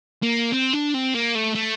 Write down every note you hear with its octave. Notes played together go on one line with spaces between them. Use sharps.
A#3
C4
D4
C4
A#3
A3
A3